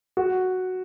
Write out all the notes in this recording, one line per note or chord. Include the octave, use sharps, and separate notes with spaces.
F#4